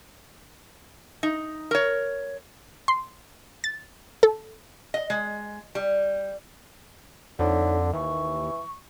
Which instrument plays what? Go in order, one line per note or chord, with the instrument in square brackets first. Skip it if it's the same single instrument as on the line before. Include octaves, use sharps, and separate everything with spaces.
[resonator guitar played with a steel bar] D#4
A#4 C#5
[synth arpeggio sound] C6
A6
A4
[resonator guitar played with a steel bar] D#5
G#3
G3
[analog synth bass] F2 [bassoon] D3 [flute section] D#4 C#5 E5
[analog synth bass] D#2 [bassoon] E3 [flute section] C#6